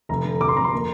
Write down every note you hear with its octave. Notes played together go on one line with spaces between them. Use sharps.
F1 A#5
D3
F1 D6
C6
F2 A#5
C6
A#3